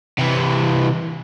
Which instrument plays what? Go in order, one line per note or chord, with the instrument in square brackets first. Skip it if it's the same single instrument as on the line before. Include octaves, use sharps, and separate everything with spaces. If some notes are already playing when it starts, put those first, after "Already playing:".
[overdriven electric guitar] C3 E3